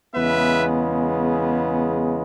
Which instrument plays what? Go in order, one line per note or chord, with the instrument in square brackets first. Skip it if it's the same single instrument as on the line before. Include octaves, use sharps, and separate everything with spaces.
[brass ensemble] E2 C#3 G#3 B3 B4 E5